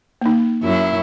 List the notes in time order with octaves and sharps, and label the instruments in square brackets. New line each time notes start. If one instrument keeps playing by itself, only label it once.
[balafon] A#3 D#4
[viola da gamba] F#2 F#3 E4